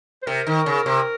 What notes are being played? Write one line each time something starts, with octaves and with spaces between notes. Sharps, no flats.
C5
C3 A#4
D#3
C#3
C3